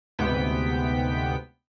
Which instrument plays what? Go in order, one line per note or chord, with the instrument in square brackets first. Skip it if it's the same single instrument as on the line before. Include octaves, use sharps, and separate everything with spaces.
[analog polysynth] D2 G#2 C3 B3 G5 B6